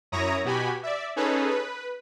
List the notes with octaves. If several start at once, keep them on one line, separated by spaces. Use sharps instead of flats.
F#2 E4 C#5 A#5 D#6 A#6
B2 F#4 G4 G#5 B5
D5 E5
C#4 D#4 G#4 A4 B4
B4